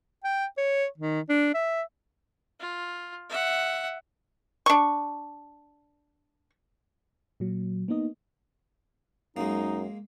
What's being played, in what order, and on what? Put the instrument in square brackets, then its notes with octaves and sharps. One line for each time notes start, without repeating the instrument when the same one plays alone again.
[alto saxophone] G5
C#5
D#3
D4
E5
[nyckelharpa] F4
E5 F#5
[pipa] D4 C#6
[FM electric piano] A#2 F#3
A#3 B3 D#4 D#5
[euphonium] F#2 [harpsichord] G#3 A#3 [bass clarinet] D#4